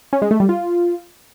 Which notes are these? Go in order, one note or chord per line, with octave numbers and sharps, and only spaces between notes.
C#4
G#3
A3
G3
F4